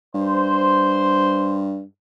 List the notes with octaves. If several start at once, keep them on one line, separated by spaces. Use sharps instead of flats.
G2 C5